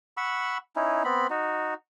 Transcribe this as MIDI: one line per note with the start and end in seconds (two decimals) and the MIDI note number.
0.17 0.58 78
0.17 0.58 83
0.17 0.58 85
0.17 0.58 88
0.76 1.03 61
0.76 1.03 63
0.76 1.03 64
1.05 1.27 59
1.05 1.27 60
1.05 1.27 83
1.30 1.74 63
1.30 1.74 66